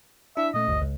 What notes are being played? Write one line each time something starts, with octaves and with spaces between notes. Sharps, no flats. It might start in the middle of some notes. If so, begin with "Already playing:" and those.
D4 E4 E5
A#2 A3 C#4 D#5
G#1 D2 G2
C#2